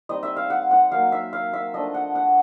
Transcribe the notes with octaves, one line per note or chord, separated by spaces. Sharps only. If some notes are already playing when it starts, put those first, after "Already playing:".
G3 C4 D#4 D#5
E5
F5
F#5
F#5
F#3 A#3 D#4 F5
E5
F5
E5
F3 A3 D4 D#5
F#5
F#5